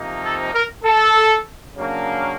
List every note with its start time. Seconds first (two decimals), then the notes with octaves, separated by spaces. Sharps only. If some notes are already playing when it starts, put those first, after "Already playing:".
Already playing: C3 F3 A#3 D#4
0.23 A4
0.53 A#4
0.84 A4
1.75 C#3 F#3 A#3 D4